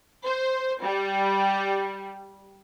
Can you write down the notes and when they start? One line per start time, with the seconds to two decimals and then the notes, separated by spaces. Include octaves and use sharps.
0.24 C5
0.82 G3